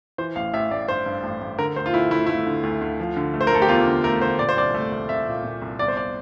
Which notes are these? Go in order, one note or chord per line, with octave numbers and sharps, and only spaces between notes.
E3 C5
A1 F5
A1 E5
A1 D5
G2 C5
G2
A1
A1
D3 A#4
D2 C5
F4
D2 E4
A3 E4
A3 E4
D3
D2
D2
F3
D3
A3
C5
A#4
A3 A4
G4
E2 F4
D3
A3 A#4
D3 C5
A#2 D5
C5
C2 D5
A3
C2
C2 E5
A#2
A#2
C2
G1 D5
C5
D5